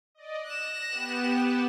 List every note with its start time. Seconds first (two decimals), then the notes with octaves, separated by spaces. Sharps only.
0.15 D5 D#5
0.47 F#6 A#6 E7
0.89 B3 G4